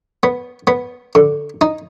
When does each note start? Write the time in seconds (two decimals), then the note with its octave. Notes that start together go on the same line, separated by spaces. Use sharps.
0.23 B3
0.67 B3
1.15 D3
1.61 D#4